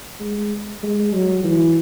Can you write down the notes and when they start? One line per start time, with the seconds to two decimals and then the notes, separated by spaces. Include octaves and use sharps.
0.20 G#3
0.83 G#3
1.14 F#3
1.44 E3